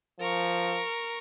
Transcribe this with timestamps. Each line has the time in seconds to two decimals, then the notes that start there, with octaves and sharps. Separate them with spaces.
0.20 F3 A#4 C#6